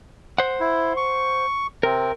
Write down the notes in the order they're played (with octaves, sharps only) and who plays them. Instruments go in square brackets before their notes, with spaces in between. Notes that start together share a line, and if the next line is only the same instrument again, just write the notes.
[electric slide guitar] C5 F#5
[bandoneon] E4
C#6
[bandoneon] C3 C4 [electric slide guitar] A#4